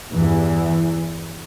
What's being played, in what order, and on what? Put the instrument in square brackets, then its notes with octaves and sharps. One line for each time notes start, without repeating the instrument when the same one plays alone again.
[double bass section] E2 G2 E3